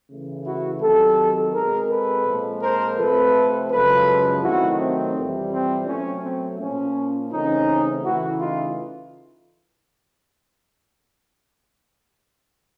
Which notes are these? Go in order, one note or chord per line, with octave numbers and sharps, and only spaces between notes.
C#3 E3 A3
E4 F#4
C3 D#3 F#3 G4 A4
B2 G#3 C4 G#4 A#4
A4 B4
A#2 F3 G#3 C4
A#4 C5
C3 F3 A3 C4 A4 B4
F#2 C#3 F3 G#3 A4 B4
C3 D#3 F#3 A3 E4 F#4
C4
F2 C3 E3 G3
C4
B2 F#3 A3 C4 C#4
C4
A#2 F3 A#3 C#4
C#3 E3 A3 C4 C#4 D#4
C#3 E3 A3 E4 F#4
D#4 F4